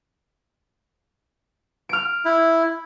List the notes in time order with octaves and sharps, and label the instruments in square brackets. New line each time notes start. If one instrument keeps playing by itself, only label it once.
[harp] F6 D7
[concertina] E4